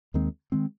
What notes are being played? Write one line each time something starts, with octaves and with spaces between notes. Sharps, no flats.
D#2 D#3 G#3 C4
D#3 G#3 C4